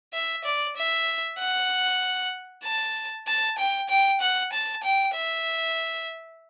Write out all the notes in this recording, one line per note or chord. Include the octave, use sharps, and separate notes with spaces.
E5
D5
E5
F#5
A5
A5
G5
G5
F#5
A5
G5
E5